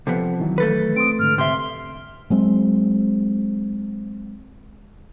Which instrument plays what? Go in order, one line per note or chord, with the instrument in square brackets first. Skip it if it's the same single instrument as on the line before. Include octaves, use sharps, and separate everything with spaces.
[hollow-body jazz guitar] C3 F3 B3 [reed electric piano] A4
[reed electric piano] D#3 E3 F#3
[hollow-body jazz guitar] A3 A4 B4
[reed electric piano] C4 C6 D#6 [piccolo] D7
[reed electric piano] G#2 D3 [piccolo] F6
[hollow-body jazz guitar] C3 E5 [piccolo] C6
[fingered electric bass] F#3 G#3 C4